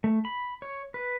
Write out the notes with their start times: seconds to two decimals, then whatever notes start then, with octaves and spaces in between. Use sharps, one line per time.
0.04 A3
0.25 B5
0.62 C#5
0.94 B4